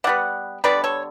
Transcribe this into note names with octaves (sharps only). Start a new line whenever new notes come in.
D3 G3 B3 D5 F#5
D3 G3 B3 B4 D5
A4 C#5